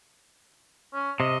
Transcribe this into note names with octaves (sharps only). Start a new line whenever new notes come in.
C#4
C3 D#5